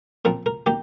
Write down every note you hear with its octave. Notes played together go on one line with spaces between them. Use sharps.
A#2 F3 C4 A#4
A#4
D#3 A#3 G4